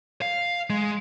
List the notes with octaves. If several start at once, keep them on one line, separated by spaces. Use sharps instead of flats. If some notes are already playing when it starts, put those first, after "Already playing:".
F5
G#3